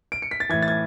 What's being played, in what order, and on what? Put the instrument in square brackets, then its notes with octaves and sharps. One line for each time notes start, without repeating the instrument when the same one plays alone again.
[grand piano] D7
C#7
B6
A6
A2 E3 G#6
A6
G#6